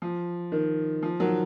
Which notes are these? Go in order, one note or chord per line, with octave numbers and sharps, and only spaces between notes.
F3
D#3
F3
D#3 F#3